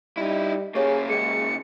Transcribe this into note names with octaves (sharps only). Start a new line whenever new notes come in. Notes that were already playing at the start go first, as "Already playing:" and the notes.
G3 D#4 E4 D#5
C#3 A#3 G4 G#4 C#5
G#3 C#4 G#4 C#7